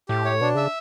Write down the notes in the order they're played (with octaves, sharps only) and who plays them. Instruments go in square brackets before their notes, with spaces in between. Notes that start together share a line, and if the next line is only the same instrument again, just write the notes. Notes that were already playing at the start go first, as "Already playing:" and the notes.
[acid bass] A2 [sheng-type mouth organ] G4
[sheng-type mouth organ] C#5
[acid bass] B2 [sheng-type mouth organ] D4
[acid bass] C#3 [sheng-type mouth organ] E5